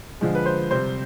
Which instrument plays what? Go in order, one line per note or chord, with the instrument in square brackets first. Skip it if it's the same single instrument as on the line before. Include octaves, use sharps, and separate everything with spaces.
[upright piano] D3 F3 G#3
B4
C5
C3 G3 C4 C5